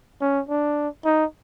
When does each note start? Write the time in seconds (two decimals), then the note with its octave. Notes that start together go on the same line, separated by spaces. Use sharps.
0.21 C#4
0.49 D4
1.05 D#4